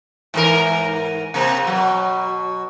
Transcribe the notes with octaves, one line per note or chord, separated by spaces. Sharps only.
G#2 E3 A#4
C3 A#3 C4
B2 F#3